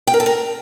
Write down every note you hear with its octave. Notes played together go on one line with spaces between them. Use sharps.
G5
A#4
A4
A#4